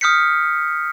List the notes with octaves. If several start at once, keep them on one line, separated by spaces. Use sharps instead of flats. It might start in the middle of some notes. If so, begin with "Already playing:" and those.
D#6 F6 G6 B6 C#7